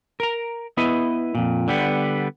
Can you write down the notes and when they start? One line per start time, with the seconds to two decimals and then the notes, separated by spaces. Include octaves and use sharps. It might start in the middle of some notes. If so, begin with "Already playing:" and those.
0.20 A#4 A#5
0.77 B3 E4 B4 D#5
1.35 F2 A#2
1.68 D3 G3 B3